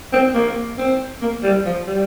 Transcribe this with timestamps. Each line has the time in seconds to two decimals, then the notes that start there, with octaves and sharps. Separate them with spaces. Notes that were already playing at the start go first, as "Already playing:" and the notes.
0.13 C4
0.34 A#3
0.78 C4
1.21 A#3
1.43 G3
1.65 F3
1.87 G3